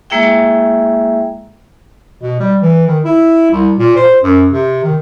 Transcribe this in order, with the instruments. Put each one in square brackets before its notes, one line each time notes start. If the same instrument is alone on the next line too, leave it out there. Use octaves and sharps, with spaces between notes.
[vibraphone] G#3 A#3 E4 G#4 E5 G5
[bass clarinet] B2
G3
E3
D#3
E4
C2
A#2
C5
F#2
C3
D#3